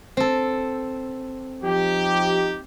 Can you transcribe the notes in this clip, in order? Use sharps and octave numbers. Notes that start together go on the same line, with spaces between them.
C4 A4
F3 D#4 G4